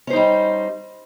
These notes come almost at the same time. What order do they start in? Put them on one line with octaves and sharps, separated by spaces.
C#4 C5 D#4 G3